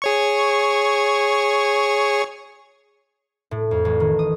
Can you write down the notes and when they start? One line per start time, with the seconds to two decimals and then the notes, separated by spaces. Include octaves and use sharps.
0.02 G#4 C#5 C#6
3.51 A2
3.71 F2
3.85 A1
4.00 D#3
4.19 D#6